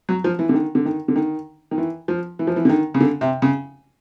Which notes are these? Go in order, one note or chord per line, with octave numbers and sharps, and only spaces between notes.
F#3
F3
E3
D3
D#3
D3
D#3
D3
D#3
D#3
E3
F3
E3
F3
E3
D3
D#3
C#3
D3
C3
C#3